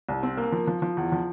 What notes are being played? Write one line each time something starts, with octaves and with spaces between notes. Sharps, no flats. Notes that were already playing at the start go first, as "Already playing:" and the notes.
C2
C4
A#3
F3
F3
F3
E2
F3